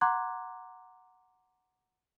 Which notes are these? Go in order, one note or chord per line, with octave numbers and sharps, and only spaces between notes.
F#5 A#5 C6 D6 F#6 G#6